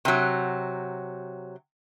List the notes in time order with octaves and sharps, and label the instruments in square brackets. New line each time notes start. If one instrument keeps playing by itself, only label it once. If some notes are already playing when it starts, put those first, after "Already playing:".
[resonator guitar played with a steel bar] C3 F#3